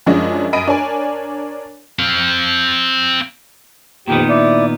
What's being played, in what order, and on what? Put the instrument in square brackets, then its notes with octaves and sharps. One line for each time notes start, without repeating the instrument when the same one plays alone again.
[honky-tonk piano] F#2 F3 G#3 C#4 D4 D#5
F#2 D#5 B5 D7 D#7
D4 A#4 C#5 D5 G#5
[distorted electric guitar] C4 F5
[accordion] F2 G4 [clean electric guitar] A#2 D#3 B3
[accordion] E4 D5